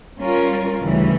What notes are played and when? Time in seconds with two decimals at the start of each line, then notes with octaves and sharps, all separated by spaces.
0.19 G3 C#4 F4 A#4
0.83 D2 C#3 E3 G3 C#4